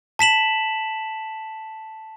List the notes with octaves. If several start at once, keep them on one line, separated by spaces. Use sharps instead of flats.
A5 B6 E7 F#7